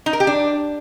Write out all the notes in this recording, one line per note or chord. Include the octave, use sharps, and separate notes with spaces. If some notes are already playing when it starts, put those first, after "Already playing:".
D#4
A#4
G4
D4